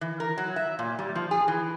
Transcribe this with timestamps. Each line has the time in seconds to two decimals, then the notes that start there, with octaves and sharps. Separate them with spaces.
0.01 E3
0.20 A#4
0.38 F#3
0.56 E5
0.79 A#2
0.99 G3
1.15 F3
1.31 G#4
1.48 E3